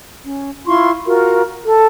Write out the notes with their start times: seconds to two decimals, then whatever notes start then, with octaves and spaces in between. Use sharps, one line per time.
0.24 C#4
0.66 E4 F4 C6 C#6
1.05 F4 F#4 A#4
1.65 A4